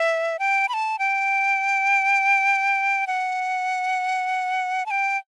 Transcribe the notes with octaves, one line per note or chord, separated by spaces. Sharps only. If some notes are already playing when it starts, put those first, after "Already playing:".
Already playing: E5
G5
B5
A5
G5
F#5
A5
G5